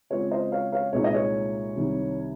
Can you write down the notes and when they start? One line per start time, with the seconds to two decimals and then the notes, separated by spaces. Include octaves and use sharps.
0.10 C#3 G#3 C4 F4 C#5
0.31 C5 D#5
0.52 C#5 F5
0.72 C#5 F5
0.93 C2 A#2 G#3 D#4 C#5
1.04 D#5
1.14 C#5
1.76 C2 C3 D#3 G3